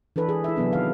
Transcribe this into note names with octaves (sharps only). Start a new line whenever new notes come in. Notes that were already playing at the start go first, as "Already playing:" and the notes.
E3 D4 A4 B4
G#4
E4 E5
C3 F#3 B3 D4
D#3 F5